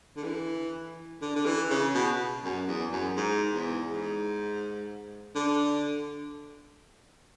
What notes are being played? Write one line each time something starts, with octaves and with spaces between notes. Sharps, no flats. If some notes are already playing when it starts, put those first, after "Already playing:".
D3
E3
D3
D3
E3
C#3
B2
F#2
E2
F#2
G#2
E2
G#2
D3